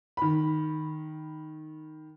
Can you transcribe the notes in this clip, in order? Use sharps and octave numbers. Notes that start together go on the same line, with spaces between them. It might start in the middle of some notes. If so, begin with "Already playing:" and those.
D#3 B5